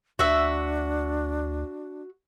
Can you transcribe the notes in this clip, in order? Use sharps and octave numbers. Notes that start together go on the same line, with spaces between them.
D2 D4 F#4 E5